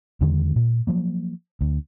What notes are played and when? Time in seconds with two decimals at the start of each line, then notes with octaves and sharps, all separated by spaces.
0.21 E2 D3 D#3 G#3
0.56 A#2
0.87 F3 F#3 A#3
1.61 D2